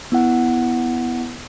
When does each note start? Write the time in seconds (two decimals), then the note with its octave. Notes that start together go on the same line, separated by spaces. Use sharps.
0.12 B3 E4 F#5